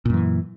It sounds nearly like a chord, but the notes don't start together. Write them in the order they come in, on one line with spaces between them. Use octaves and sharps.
A#2 F#2 E3